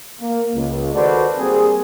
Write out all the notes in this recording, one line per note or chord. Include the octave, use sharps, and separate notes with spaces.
A#3
C#2
D#3 F#4 A4 B4 C5 D5
G3 A#3 C4 G4 G#4